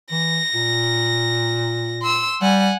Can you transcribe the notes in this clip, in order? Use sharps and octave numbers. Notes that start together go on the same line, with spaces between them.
E3 A#6
A#2
C6 E6
G3 F#5 G#5